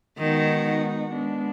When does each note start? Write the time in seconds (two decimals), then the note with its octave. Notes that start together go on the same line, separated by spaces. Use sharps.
0.18 D#3 G#3 B3 D#4 F#4
1.07 G#3 B3 D4